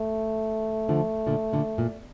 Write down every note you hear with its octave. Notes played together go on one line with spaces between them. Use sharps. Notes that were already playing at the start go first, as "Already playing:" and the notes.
Already playing: A3
D3 F3
A#2 D3
A#2 D3
A#2